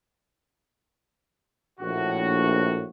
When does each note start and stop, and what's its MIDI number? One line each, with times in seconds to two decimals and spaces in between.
1.80 2.87 34
1.80 2.87 45
1.80 2.87 66